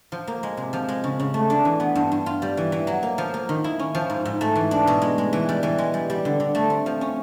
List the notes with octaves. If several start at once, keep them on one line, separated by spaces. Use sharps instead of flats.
F3
A#3
G#3
C3
F3
G#3
C#3
C#3
A3
D4
E3
B3
G2
G2
F4
G3
E3
E3
F#3
A#3
F3
A#3
D#3
E4
C#4
F3
G#2
G#2
A3
E3
D4
B2
G#3
G#3
E3
G3
E3
G#3
G3
G3
D3
D3
A3
C4
F3
C#4